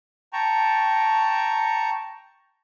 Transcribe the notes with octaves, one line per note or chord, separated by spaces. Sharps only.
G5 A5 A#5 C#6